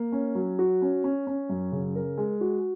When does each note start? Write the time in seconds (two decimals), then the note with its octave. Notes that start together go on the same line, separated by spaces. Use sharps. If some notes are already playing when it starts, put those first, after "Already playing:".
Already playing: A#3
0.12 C#4
0.35 F#3
0.59 F#4
0.82 C#4
1.04 C#4
1.27 C#4
1.49 F#2
1.72 C#3
1.96 A#4
2.18 G#3
2.41 F#4